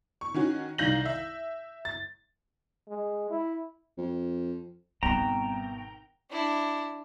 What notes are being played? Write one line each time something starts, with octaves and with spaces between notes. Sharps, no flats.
C#6
D#3 C#4 F#4
C2 D#3 F5 G6 A#6 F#7
E5
A6
G#3
E4
F2
G#1 B2 G3 C4 G5 A#5 E7
D4 E4